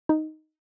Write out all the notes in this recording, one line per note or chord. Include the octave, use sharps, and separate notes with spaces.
D#4